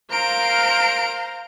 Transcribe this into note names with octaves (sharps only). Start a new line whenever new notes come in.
A#4 C5 F5 A#5 D7